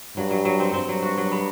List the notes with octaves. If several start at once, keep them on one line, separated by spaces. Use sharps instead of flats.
G2 F#3
F#3
F#3
C4
G2 C4
F#3
F#4
F#3
B3